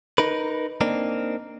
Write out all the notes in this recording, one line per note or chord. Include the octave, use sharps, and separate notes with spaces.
D#4 A#4 B4
A#3 C4 D4 D#4